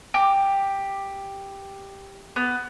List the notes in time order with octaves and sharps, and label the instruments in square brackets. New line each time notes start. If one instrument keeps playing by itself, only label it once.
[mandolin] G4
B3